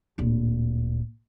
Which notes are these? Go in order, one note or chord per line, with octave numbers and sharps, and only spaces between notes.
D1 A#2